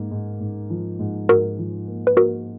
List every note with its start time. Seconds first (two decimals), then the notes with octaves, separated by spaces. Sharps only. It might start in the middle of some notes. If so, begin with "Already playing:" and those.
Already playing: G#2 A#3
0.11 G#2
0.40 G#2
0.70 F3
0.99 G#2
1.29 G#2 F#4 A#4
1.59 F3
1.88 A#3
2.07 B4
2.17 A#3 F#4 A#4